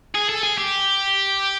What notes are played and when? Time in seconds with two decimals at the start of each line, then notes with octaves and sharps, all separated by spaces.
0.15 G#4
0.29 A4
0.43 G#4
0.58 G4